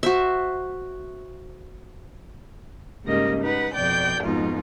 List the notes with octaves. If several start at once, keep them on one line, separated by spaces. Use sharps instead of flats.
F#4 C5 E5
G#2 C#3 G3 A#3 D#5
D#4 B4 F#5
F2 B2 D5 G5 G6
F2 G#2 B2 D#4 F4